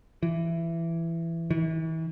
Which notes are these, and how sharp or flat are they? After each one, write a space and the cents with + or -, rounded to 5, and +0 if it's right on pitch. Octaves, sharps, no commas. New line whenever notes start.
E3 +15
E3 -35